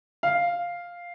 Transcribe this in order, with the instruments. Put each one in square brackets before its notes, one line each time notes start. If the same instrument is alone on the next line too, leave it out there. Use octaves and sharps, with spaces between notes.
[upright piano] F5